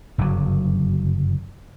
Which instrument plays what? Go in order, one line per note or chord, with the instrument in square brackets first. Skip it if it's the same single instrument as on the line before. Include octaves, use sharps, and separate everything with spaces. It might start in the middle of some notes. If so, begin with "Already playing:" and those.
[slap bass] F#1 G2 D3 F#3